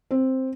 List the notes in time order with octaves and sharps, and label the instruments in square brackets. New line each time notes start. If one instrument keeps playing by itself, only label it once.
[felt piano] C4